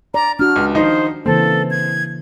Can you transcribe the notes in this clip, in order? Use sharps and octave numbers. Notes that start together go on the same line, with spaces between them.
D5 A#5
D4 F#4 F6
C#2
D#3 F3 D#4 C5
C#3 E3 A#3 C4 A4
G#6